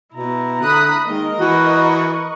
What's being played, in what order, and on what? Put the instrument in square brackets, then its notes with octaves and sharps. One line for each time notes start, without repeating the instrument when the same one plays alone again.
[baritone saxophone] B2 [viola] E4 A#5
[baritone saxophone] D3 [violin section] B5 D#6 F#6
[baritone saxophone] D#3 [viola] G#3 A#3 [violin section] A#4 D#5
[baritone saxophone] E3 [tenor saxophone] F#4 [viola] B4 C#6